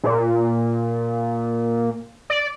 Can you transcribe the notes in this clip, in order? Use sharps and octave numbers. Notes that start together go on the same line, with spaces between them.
A#2
D5